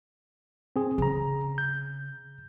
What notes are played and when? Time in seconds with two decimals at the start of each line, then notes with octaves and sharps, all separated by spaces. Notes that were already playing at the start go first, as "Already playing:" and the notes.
0.76 C4 G#4
0.98 C#3 G#4 A#5
1.58 G6